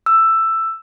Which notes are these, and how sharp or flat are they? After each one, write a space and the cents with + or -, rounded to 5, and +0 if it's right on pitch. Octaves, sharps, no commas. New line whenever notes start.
E6 +10